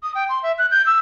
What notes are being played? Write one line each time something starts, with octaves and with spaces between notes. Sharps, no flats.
D#6
G5
C6
E5
F#6
G6
E6